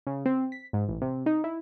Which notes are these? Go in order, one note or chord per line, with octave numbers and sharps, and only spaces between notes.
C#3
C4
B6
G#2
A1
C3
D#4
E4